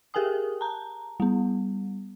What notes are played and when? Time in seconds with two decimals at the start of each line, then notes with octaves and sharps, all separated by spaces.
0.14 G4 G#4 A#4 G5 G#5 D#6
0.61 A5 A#5
1.20 G3 B3